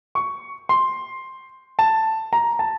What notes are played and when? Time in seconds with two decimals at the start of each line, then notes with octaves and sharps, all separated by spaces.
0.15 C#6
0.69 C6
1.79 A5
2.33 A#5
2.59 A5